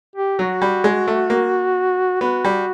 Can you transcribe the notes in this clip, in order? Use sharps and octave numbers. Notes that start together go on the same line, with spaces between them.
G4
F#3 F#4
G3
G#3
A3
A#3
B3 F#4
G3